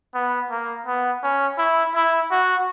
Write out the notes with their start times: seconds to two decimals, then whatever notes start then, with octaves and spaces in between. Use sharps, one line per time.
0.14 B3
0.50 A#3
0.86 B3
1.23 C#4
1.58 E4
1.95 E4
2.31 F#4